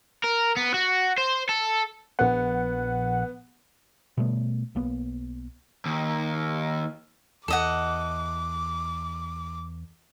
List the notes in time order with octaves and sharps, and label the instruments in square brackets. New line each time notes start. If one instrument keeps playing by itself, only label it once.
[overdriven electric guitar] A#4
B3
F#4
C5
A4
[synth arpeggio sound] A#1 F#5 [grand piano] B3
[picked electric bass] B2 G3 A3 B3
B1 A#3 B3
[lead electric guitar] D#2
[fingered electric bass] E2 [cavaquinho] A4 D#5 F#5 [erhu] D6